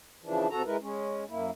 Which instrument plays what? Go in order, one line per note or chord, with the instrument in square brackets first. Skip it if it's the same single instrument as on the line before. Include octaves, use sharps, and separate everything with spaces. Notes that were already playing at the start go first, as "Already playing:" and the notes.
[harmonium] C#3 E3 F3 D4
C3 F#4 A4 A#5
G#3 E4 A#4 B4
G#3 C#4
F#2 A#3 E4